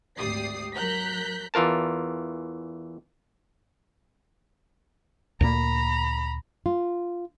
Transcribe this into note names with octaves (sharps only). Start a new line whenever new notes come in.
G#1 D2 G4 D5 D#6 C7
F#3 A#4 A#5 F#6 G6 B6
E2 E3 F4 A#4 A5
D2 A#2 A#3 A#5 B5
F4